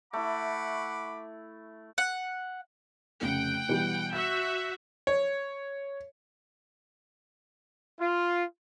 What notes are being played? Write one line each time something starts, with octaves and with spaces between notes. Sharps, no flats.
A3 E4 F#5 B5 D6
F#5
F1 C#3 F#5 G5
B2 E3 G3
F#4 E5 G6
C#5
F4